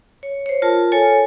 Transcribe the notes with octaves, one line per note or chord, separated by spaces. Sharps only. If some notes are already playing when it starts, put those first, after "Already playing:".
C#5
C5 C#5
F4 A#4 A5
A4 C#5 G#5